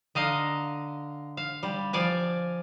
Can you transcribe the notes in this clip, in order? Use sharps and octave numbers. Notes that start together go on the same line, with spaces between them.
D3 D#5 F5 A#5
F5
G3
F3 D5 F5 G#5